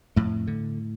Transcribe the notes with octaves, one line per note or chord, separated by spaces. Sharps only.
F2 A2 A3
D3